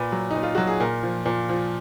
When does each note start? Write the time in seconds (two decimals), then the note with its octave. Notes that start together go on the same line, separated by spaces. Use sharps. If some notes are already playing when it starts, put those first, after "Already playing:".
Already playing: A#2 B4
0.12 F#3
0.31 A#2 D#4
0.43 F4
0.55 F#3 F#4
0.67 G#4
0.80 A#2 A#4
1.03 F3
1.26 A#2
1.49 F3